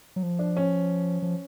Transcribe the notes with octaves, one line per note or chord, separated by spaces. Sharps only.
F#3
F3
D4
C#4
F3